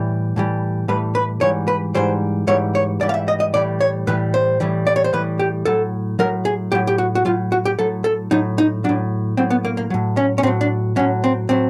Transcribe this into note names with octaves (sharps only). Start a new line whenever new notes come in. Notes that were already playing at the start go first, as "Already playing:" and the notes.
Already playing: A2 E3 G3
A2 E3 G3
A2 E3 G3 B4
B4
G#2 E3 G3 C#5
B4
G#2 E3 G3 C5
G#2 E3 G3 C#5
C#5
G#2 E3 G3 D5
F5
E5
D#5
D#5
A2 E3 G3 D5
C#5
A2 E3 G3 B4
C5
A2 E3 G3
D5
C#5
C5
A2 E3 G3 B4
G4
A2 F#3 A4
A2 F#3 A#4
G#4
A2 F#3 G4
G4
F#4
F#4
A2 F#3 F4
F#4
G4
A2 F#3 A4
A4
A2 F#3 D#4
D#4
A2 F#3 D4
A2 F#3 C4
B3
A#3
A#3
A2 F#3
C#4
C#4
A2 F#3 C4
D4
A2 F#3 C#4
C4
A2 F#3 C4